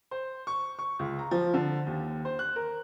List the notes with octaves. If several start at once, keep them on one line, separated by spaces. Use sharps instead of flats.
C5
C#6
C#6
C#2
A#5
F3
D3
D#2
C5
F#6
A#4